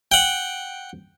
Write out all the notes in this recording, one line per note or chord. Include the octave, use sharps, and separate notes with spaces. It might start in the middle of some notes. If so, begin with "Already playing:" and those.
F#5 G5